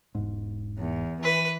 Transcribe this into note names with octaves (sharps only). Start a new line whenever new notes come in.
E1 G#2
E2
E3 B4